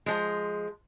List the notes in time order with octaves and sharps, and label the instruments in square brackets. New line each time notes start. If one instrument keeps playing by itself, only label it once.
[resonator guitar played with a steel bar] F3 G#3